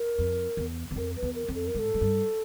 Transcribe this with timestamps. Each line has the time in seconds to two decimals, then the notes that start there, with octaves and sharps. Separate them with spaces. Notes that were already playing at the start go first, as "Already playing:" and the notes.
Already playing: A#4
0.18 F2
0.57 E2
0.91 E2
0.96 F2 A#4
1.16 B4
1.22 E2
1.35 A#4
1.48 F2
1.55 A4
1.67 A#4
1.75 G#2 A4
1.94 G#2
2.01 G2